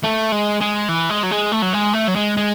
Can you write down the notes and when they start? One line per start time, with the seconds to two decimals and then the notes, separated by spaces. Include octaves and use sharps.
0.04 A3
0.32 G#3
0.61 G#3
0.88 E3
1.10 G#3
1.23 F#3
1.31 G#3
1.52 A3
1.62 F#3
1.74 G#3
1.94 A3
2.08 F#3
2.16 G#3
2.37 G#3